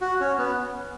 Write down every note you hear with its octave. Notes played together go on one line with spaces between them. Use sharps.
F#4
C#4
B3